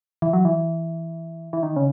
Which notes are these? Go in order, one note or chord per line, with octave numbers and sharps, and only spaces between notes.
E3
F#3
E3
E3
D#3
C#3